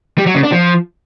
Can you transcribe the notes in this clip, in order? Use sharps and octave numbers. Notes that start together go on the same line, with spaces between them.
G3
F#3
C#3
D4
F3